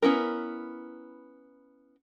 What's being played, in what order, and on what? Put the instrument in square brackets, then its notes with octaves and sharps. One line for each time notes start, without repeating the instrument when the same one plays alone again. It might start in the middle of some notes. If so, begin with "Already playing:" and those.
[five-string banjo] B3 C#4 E4 A#4